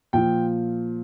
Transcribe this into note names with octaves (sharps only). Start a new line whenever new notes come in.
A#2 F3 G5